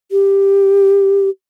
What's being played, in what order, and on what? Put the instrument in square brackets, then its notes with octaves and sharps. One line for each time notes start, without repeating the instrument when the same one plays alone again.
[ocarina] G4